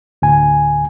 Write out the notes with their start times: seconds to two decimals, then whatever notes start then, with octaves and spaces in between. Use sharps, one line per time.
0.22 D2 A2 G#5